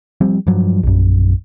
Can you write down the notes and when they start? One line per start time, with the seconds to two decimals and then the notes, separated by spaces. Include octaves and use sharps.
0.21 F3 G3 C4
0.47 G2 F3 F#3
0.83 A#1 F#2